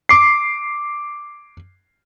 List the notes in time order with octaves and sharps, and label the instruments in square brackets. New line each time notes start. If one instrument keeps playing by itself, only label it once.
[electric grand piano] D6 C7